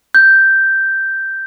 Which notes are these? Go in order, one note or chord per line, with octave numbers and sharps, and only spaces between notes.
G6